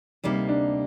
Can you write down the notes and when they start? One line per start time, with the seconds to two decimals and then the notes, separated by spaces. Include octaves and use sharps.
0.24 D2 C3 G3 A#3 D#4
0.49 D4